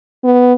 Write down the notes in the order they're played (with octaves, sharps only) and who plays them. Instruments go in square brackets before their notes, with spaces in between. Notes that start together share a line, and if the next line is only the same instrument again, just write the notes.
[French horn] B3